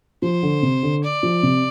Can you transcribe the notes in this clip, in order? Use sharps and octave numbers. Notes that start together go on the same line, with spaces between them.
F3 C5
D3
C3
D3
D5
F3
C3